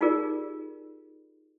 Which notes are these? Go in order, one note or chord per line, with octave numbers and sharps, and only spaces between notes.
D#4 F4 G4 G#4 A#4 D5